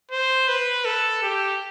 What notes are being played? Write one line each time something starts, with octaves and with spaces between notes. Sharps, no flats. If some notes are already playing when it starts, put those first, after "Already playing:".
C5
B4
A4
G4